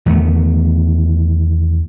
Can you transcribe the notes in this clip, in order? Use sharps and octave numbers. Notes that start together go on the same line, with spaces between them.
E2 D#3 A3